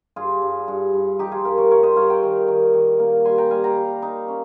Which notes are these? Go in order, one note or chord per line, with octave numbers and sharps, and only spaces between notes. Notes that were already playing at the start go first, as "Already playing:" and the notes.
G2 F4 G#4
G2
G2
G2
F3 D#4 G4
F4 G#4
G2 G4 A#4
A#4 C#5
G2 A#4 C#5
C5 D#5
G2 C#5 F5
G5 A#5
D#3
D#3
D#3
A#3
G3 G#5 C6
G5 A#5
G3 F5 G#5
G5 A#5
G3
D#4
C#4